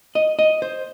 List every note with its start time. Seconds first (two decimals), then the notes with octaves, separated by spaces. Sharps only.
0.15 D#5
0.39 D#5
0.62 C5